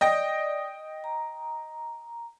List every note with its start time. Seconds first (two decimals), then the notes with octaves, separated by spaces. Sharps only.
0.01 D5 D#5 G5 D#6 A#6
1.04 A#5